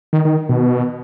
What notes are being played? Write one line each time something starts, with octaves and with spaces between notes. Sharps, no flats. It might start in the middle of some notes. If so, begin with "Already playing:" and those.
D#3
D#3
B2